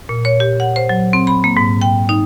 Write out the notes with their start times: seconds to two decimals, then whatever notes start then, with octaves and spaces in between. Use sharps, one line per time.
0.09 A#2
0.25 C#5
0.40 G4
0.60 F#5
0.76 C5
0.89 F#3
1.13 C4
1.27 B5
1.44 A#3
1.57 G#2
1.82 G5
2.09 D#4